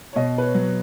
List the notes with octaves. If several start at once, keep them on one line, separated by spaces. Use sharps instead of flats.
C#5
B2 D#5
B4
C#5
F#3